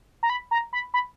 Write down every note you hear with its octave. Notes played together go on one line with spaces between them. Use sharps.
A#5
B5
A#5
B5
B5